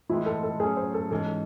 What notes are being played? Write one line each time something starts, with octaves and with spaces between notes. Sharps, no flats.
A2 E3 G#3 C4 E4
A4
A4
A2 F#3 C#4 G#4
C5
A4
G#2 E3 G#3 C#4 A4